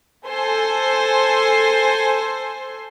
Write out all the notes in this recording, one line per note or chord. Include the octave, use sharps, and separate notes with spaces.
A4 C5 G#5 C6